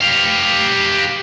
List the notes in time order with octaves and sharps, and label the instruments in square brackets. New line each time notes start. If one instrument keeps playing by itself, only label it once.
[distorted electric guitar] G4 F5